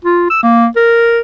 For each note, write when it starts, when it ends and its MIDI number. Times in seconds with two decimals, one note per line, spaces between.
0.04 0.28 65
0.30 0.38 88
0.43 0.67 58
0.76 1.20 70